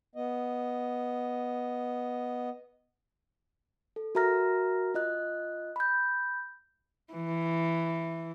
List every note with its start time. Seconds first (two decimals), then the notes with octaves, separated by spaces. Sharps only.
0.15 B3 D#5
3.96 A4
4.15 F#4 A#4 E5 A#5 F6 A#6
4.94 F4 D#5 F#6
5.76 B5 G6
7.13 E3